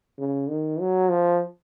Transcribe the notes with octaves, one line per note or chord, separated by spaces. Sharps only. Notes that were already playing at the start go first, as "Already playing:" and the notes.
C#3
D#3
F#3
F3